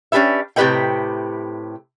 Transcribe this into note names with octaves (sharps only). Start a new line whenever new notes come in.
C#4 D4 G4 B4 E5
A2 C3 G4 B4 D#5 G5